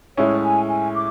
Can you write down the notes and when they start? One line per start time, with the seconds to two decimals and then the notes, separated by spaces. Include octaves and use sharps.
0.17 A2 G#3 C#4 E4 C#5
0.43 G#5
0.69 G#5
0.94 D6